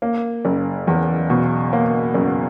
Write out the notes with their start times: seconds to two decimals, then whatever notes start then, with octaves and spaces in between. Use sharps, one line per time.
0.02 A#3
0.45 F#1
0.87 E2
1.30 B2
1.73 A#3
2.14 F#1